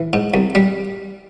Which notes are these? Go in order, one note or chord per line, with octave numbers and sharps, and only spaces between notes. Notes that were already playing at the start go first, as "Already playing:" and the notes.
Already playing: E3
G#2
C2
G3